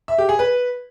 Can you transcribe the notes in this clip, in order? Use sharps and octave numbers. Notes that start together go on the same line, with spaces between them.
E5
G4
G#4
B4